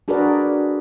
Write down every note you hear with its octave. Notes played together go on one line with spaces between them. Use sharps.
D4 F#4 G#4 A#4 B4 D5